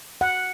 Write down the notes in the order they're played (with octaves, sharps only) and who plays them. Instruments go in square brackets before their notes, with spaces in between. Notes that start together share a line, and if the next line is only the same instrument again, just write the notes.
[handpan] F#5